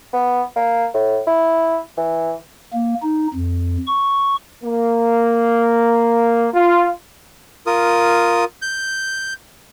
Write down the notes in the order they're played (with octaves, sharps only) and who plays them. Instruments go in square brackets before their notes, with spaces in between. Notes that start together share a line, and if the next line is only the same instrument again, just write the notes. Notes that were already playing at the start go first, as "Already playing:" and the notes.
[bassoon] B3
A#3
A2
E4
E3
[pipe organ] A#3
D#4
F2
C#6
[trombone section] A#3
F4
[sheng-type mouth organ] F4 A#4 D#6
G6